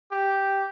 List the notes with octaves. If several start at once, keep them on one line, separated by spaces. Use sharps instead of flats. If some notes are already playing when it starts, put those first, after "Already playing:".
G4